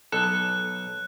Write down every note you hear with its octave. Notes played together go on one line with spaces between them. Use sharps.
B1 A4 F#6